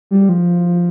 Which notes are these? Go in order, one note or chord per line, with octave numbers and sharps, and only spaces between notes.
G3
F3